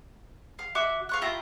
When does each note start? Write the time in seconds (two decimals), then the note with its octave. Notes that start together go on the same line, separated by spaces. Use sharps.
0.59 F5
0.75 F#4 E5 D6
1.09 F5 C#6 F#6
1.22 E4 F4 G4 A#5